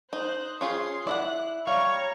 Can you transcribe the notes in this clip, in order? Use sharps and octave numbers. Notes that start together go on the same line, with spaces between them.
D#4 C5 F#6
C#4 F4 G#4 C6
E4 D5 D#5 F#5 F#6
G3 C#5 F5 A#5 C#6